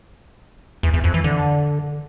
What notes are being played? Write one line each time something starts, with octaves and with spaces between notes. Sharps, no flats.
E2
E2
F2
E3
D3